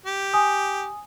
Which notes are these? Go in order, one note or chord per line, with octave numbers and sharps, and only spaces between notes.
G4
G#5 D#6